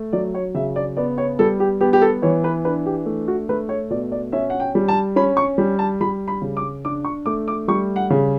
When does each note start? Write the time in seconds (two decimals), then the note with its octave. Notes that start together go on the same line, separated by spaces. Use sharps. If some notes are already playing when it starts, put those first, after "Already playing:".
Already playing: A3
0.13 F#3 D5
0.34 C#5
0.54 C#3 E5
0.76 D5
0.97 B3 D5
1.18 C#5
1.39 G3 A4
1.60 G4
1.81 B3 G4
1.93 G4
2.02 A4
2.22 E3 C#5
2.44 B4
2.65 D4 B4
2.86 G4
3.06 A3
3.28 F#4
3.49 A3 B4
3.69 C#5
3.90 B2 D5
4.12 D5
4.32 C#4 E5
4.50 F#5
4.60 G5
4.75 G3
4.88 A5
5.16 C#4 B5
5.37 C#6
5.58 G3
5.79 A5
6.01 G3 B5
6.28 B5
6.42 C#3
6.57 D6
6.85 D4 D6
7.05 C#6
7.26 A3 D6
7.48 D6
7.68 G3 C#6
7.96 F#5
8.10 C#3